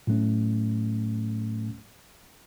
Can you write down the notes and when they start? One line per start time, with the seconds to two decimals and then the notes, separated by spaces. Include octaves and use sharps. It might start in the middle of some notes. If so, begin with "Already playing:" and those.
0.07 A2 F#3 A3 C#4